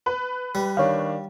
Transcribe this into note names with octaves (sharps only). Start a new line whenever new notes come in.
B4
G3
D#3 D4 C#5 F5